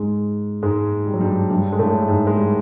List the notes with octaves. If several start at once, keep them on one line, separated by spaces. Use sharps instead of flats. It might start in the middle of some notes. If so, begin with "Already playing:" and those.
Already playing: G#2 G#3
G#2 G#3
G3
F#3
G2 G3
G2 G3
G#3
A2 A3
G#2 G#3
G#3
G3